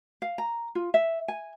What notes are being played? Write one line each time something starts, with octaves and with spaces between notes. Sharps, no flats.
F5
A#5
F4
E5
G#5